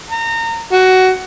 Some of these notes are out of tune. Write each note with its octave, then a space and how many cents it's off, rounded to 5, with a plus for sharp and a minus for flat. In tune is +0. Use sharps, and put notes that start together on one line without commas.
A#5 -30
F#4 +15